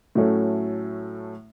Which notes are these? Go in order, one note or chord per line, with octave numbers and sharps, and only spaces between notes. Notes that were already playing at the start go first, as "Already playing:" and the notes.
A2 F#3 A3 C#4 A4